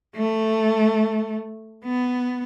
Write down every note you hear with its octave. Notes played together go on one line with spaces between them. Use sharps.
A3
B3